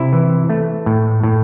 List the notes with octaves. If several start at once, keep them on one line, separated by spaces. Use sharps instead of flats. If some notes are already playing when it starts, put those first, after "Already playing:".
Already playing: C3 E4
E3
A3
A2
A2